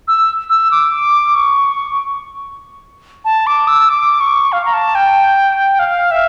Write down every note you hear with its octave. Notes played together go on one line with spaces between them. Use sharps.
E6
E6
D6
C#6
A5
D6
E6
D6
C#6
F5
A#5
A5
G5
F5
E5